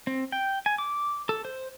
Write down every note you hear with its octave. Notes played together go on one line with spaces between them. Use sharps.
C4
G5
G#5
D6
A4
C5